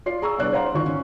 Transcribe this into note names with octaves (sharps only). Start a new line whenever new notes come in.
F4 D5 C7
G#4 A#5 C#6 E6
C2 B3 D4 D5 F#6
C5 D5 F5 F#5 A#5 C6
G#1 D#3 F4 C#6
C#4